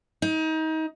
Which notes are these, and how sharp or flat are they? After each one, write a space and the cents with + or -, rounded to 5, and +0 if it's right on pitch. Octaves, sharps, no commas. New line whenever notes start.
D#4 +30